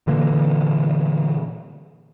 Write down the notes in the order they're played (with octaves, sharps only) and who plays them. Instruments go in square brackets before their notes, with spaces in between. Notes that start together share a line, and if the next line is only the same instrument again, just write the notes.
[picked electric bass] A#2 D3 E3 A#3